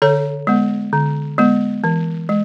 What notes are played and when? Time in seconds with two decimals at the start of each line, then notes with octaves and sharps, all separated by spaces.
0.02 D3 A4 C#5
0.47 G#3 B3
0.93 D3
1.38 G#3 B3
1.84 E3
2.29 G#3